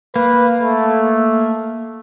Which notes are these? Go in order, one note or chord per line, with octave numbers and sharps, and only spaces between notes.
A#3 B4
A3